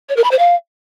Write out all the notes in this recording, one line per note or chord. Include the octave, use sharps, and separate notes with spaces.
C#5
A#4
B5
C5
F5